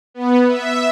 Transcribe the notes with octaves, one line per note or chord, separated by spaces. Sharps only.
B3
E5